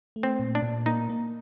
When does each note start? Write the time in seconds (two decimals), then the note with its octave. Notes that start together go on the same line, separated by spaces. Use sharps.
0.16 A3
0.23 C4
0.39 A#2
0.55 D4
0.62 A#2
0.86 A#3 D#4
1.09 A#3